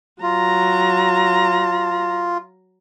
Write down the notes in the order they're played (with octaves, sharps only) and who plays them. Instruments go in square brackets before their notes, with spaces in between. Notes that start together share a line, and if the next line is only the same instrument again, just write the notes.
[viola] F#3 A#5 [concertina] F4